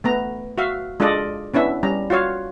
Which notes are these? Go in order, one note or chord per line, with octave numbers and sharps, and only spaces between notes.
A3 B3 A#5
F#4 E5 F5
G#3 D4 F4 A4 D5 D#5
B3 C#4 D4 E4 E5
G3 C#4 A#5
F4 F#4 C#5 F5